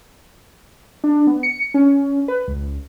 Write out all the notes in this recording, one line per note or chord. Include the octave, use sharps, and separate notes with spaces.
D4
B3
C#7
C#4
B4
C#2